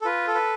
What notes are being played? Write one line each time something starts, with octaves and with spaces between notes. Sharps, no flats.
A4
F4 B4
A4
B4